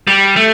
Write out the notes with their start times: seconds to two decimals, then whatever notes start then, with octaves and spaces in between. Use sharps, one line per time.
0.07 G3
0.36 A3